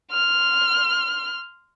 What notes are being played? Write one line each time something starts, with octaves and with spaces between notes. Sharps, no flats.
C6 F6